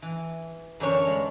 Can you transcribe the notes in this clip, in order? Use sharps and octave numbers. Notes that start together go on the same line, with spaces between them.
E3
F#2 D3 E3 A4 A#4 C#5
G#3 B5